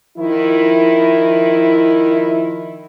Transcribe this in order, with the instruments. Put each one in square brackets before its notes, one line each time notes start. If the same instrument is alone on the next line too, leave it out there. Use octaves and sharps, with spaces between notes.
[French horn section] D#3 F3 E4